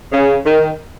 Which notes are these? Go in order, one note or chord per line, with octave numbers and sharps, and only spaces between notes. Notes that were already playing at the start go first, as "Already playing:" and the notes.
C#3
D#3